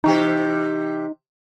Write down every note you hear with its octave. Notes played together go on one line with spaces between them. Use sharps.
C3 E3 D#4 G4